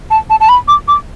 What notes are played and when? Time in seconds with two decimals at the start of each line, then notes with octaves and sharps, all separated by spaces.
0.11 A5
0.30 A5
0.40 A5
0.49 B5
0.68 D6
0.88 D6